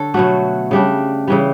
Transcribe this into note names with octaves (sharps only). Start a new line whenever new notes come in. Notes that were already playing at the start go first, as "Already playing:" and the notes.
Already playing: D3 A4 C#5
B2 F#3 A3 F#4
C#3 G3 D4
C#3 E3 G3